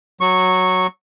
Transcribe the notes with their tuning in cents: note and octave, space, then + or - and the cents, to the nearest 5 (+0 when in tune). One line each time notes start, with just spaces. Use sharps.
F#3 +0 C#6 -10